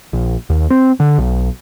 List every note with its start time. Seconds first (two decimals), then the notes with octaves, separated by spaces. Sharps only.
0.13 A#1
0.50 D#2
0.70 C4
1.00 D3
1.18 B1